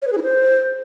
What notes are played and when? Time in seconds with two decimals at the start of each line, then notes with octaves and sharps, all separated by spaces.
0.02 C#5
0.07 B4
0.12 G#4
0.18 E4
0.23 C5